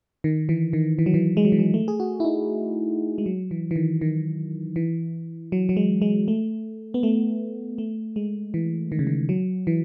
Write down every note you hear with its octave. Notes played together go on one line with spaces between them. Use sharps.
D#3
E3
D#3
E3
F#3
E3
G#3
F#3
E3
F#3
A3
G#4
F#4
E4
D#4
G#3
F#3
E3
E3
D#3
D#3
E3
F#3
F#3
G#3
G#3
A3
B3
A3
A3
G#3
E3
D#3
C#3
D#3
F#3
E3